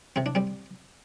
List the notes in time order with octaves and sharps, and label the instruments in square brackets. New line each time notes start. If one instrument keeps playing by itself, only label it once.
[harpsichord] C3 C4
D4
G3 C4